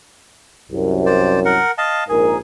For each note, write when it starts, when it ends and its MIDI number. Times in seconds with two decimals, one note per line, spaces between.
0.71 1.58 36
0.71 1.58 42
1.06 1.40 72
1.06 1.40 74
1.45 1.71 70
1.45 1.71 78
1.78 2.04 75
1.78 2.04 77
1.78 2.04 81
2.09 2.37 34
2.09 2.37 44
2.09 2.38 68
2.09 2.37 70